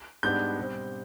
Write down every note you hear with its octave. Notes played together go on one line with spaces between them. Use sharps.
G#2 G3 B3 D4 G6
B2 G3 C4